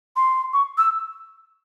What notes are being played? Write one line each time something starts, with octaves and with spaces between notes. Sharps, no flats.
C6
C#6
E6